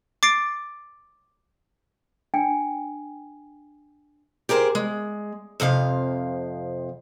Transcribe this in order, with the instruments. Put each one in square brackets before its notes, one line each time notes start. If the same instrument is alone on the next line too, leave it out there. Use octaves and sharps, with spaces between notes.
[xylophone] D6 A6 C7 D7
[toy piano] D4 G5 G#5
[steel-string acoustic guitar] G4 G#4 A#4 C5
G#3
F2 C3 F3 F5